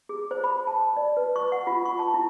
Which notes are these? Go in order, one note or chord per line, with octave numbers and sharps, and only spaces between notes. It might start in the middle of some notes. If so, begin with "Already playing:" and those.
G#4
C5
B5
A5
D5
B4
C#6
F#5
F4
C#6
A5
E4